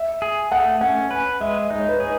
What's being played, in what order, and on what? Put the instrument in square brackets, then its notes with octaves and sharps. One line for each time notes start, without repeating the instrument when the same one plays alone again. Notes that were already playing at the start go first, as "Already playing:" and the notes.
Already playing: [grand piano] E5
[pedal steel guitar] G#4
[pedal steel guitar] A3 [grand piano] F#5
[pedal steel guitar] C#4 [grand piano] F#5
[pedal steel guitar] B4 [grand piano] G#5
[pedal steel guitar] G#3 [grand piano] E5
[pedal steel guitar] D#4 [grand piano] D#5
[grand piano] C#5
B4
[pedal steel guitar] G#4 [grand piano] C#5